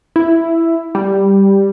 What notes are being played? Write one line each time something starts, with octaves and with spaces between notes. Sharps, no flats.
E4
G3